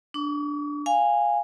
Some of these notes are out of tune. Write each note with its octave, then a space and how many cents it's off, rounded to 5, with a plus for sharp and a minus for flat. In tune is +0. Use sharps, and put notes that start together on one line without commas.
D4 +0 C#6 +45
F5 +0 G#5 -15